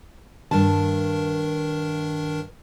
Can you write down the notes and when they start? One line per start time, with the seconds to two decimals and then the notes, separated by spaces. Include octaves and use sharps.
0.51 G2 D#3 D4 A#4 A5